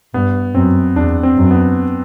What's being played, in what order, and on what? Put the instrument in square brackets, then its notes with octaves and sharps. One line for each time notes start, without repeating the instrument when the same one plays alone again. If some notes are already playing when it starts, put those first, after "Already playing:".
[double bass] G2 [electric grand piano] B3
[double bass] F#2 [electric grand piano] C4
[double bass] E2 [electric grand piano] D4
[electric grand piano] C4
[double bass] F#2
[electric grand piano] B3